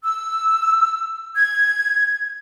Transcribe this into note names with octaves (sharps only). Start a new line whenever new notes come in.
E6
G#6